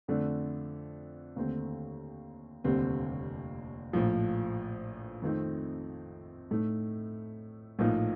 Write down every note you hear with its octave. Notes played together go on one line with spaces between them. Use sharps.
F2 D3 A3 D4
D#2 D3 A3 C4
F1 D#2 D3 G3 C4
A#1 A2 F3
F2 D#3 A3 C4 D#4
A2 A3 D#4
A#1 A2 F3 A#3 D#4